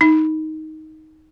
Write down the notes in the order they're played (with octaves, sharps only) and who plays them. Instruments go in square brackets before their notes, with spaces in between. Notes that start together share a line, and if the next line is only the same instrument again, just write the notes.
[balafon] D#4